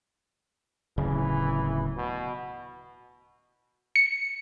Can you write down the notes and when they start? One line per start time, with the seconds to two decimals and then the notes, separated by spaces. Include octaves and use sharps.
0.98 D1 C#3 E3
1.97 B2
3.96 C#7